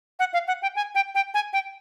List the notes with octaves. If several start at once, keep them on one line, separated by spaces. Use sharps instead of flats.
F#5
F5
F#5
G5
G#5
G5
G5
G#5
G5